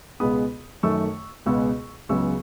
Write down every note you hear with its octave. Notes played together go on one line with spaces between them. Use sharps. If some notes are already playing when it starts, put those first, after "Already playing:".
C#2 B2 G#3 B3 B5 D#6
F#2 D#3 A3 C#6 E6
C#2 B2 G#3 B3 C#6 E6
C#2 C#3 F#3 B3 C#6 E6